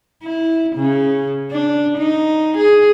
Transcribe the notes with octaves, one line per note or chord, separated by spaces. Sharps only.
E4
C#3
D4
D#4
G#4